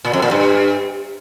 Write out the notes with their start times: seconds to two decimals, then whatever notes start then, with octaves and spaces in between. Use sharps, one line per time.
0.05 A#2
0.13 F2
0.22 A#2
0.31 G2